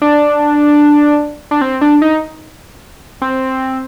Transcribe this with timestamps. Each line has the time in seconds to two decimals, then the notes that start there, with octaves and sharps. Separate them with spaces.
0.02 D4
1.51 D4
1.61 C4
1.81 D4
2.02 D#4
3.22 C4